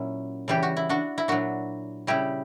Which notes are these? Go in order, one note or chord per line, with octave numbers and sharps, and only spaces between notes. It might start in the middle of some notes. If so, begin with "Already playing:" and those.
Already playing: A#2 F#3 C#4 E4
C#3 E3 G3 G4
F#4
E4
D4 F#4
E4
A#2 F#3 D4 F#4
C#3 G3 E4 G4